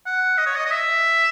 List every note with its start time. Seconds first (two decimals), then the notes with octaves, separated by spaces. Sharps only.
0.06 F#5
0.38 D#5
0.46 C#5
0.55 D#5
0.65 D#5
0.71 E5